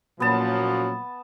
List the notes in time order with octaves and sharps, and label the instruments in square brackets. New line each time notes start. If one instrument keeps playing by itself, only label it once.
[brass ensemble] A#2 F3 F#3 [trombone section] A#3 C#4 F#4 [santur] B3 A5